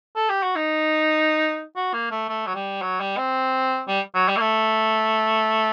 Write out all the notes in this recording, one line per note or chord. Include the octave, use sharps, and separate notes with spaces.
A4
G4
F#4
D#4
F#4
A#3
A3
A3
F#3
G3
F#3
G3
C4
G3
F#3
G3
A#3
A3